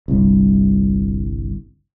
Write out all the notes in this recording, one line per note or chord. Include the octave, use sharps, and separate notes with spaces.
G1 C2